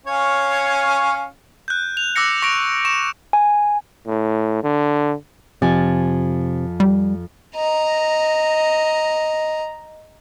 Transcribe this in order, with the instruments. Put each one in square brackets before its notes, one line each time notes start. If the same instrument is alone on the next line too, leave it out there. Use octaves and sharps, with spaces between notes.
[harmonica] C#4 C#5 F5
[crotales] F#6 G6
F7
D6 E6 F#6 A#6 C#7
C#6 A#6 D7 F7
C#6 D7 E7
[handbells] G#5
[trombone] A2
D3
[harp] F2 G#5 A6 [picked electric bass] C3
[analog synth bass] G3
[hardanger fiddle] D#5 A#5